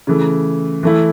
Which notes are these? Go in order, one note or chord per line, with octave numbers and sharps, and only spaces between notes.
C#3 E3 A3
E3 A3 E4